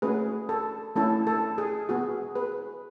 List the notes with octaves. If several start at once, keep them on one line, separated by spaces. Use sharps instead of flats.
A3 C#4 F#4 G#4 B4
A4
A3 C#4 E4 A4
A4
G#4
B3 F#4 G#4
G#4 B4